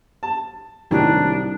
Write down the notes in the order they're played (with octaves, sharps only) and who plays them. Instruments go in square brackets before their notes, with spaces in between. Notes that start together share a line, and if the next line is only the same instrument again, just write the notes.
[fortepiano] A5
[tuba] C2 [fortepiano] A2 D#3 F#3 [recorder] D4